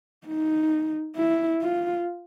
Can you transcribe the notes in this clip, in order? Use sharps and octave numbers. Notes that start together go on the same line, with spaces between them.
D#4
E4
F4